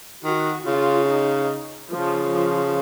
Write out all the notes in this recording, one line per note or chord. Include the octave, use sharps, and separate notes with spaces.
D#3 F#4
C#3 F4
D#4
C#3 F3
F3